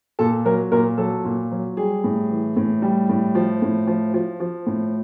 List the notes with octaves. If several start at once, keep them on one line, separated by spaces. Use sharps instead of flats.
A#2 A4
F#3 A#4
A#2 A#4
F#3 A4
A#2
F#3
G3 G#4
A2
E3
A2
G3
A2
F3
A2
F3
F3
F3
A2